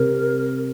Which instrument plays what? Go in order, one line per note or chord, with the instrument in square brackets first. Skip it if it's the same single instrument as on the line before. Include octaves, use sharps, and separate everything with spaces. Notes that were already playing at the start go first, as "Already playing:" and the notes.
Already playing: [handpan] C3 [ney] A#4